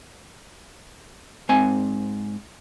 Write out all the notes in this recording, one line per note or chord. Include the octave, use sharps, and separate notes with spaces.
G#2 C4 G#5